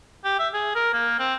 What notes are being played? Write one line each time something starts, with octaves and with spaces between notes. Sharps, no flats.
G4
E5
G#4
A#4
A#3
C4